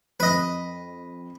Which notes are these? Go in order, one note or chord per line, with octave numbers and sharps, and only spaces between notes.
F2 B4 D#5